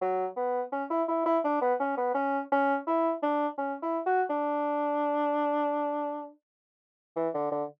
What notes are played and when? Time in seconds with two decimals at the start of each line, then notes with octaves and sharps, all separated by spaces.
0.01 F#3
0.37 B3
0.72 C#4
0.90 E4
1.08 E4
1.26 E4
1.44 D4
1.61 B3
1.80 C#4
1.97 B3
2.15 C#4
2.51 C#4
2.87 E4
3.23 D4
3.58 C#4
3.82 E4
4.06 F#4
4.30 D4
7.16 E3
7.34 D3
7.51 D3